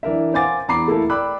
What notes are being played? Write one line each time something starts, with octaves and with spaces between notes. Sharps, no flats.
E3 D4 A#4 E5
C5 F5 F#5 G#5 D6 A6
E2 A#5 B5 D6 C7
A3 A#3 E4 A4 A#4
D5 G5 B5 D6 E6 F#6